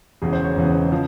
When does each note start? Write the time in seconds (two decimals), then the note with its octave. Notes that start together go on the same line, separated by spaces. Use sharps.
0.22 E1 E2 C#3 G#4
0.33 C5
0.44 C#5
0.56 E1 E2 C#3
0.92 C#3 F3